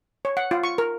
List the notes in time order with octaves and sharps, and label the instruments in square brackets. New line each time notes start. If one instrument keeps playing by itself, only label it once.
[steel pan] C#5
F#5
F4
C#6
A#4